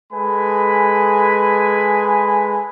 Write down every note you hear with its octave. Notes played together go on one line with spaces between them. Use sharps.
G#3 A4 B4 G#5 B5